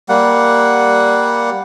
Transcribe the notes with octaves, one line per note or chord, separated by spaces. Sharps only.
G3 A#3 F#5